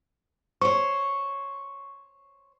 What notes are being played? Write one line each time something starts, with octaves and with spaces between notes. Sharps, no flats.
C5 C#5 C#6